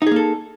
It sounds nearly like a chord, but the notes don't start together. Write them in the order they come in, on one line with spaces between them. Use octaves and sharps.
D#4 G#4 A#3 A4